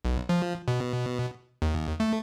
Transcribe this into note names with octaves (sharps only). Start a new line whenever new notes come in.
B1
F3
B2
D#2
A3